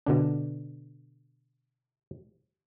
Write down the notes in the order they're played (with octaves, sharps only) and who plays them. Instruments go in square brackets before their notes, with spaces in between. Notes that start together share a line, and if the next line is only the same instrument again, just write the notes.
[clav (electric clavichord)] B2 D3 D4